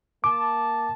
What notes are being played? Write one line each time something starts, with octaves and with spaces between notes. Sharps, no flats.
A#3 A5 D6